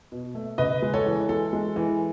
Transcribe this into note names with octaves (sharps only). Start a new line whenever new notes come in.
B2
A3
C#3 B4 D#5
G#3
A4 C#5
E3
G#3 A4
G#3
E3